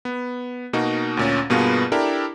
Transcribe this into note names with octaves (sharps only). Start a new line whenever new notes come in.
B3
B2 A#3 D#4 F#4
D2 A#2 C#4
G2 B2 A#3 B3 F4 G#4
D4 E4 G4 A4 A#4